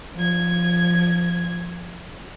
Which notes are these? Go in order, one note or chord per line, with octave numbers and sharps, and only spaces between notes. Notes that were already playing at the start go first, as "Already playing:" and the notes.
F3 G#6